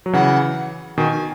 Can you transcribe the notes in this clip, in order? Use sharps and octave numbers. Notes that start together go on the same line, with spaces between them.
F#3
C#3 E3 F#5
B2 D#3 G#5